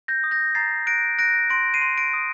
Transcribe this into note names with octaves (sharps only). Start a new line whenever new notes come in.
G6 A#6
D#6
G6 A#6
A#5 A6 C7
F#6 A#6 D7
F#6 A#6 D7
C6 A#6 D7
C7 D#7
C6
A#6 D7
D#6